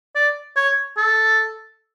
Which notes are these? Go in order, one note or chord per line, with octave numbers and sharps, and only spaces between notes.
D5
C#5
A4